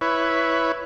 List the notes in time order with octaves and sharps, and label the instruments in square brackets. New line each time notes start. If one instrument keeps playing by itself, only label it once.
[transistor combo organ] E4 B4 C#5